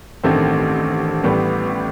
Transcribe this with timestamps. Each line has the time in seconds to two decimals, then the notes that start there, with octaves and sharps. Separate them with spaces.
0.23 A1 G2 D#3 A3 C4
1.24 A1 A2 G3 B3